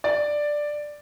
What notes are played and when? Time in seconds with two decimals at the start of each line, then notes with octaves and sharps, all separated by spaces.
0.04 D5